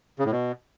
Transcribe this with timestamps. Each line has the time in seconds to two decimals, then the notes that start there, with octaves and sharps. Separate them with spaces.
0.19 C#3
0.25 A2
0.32 B2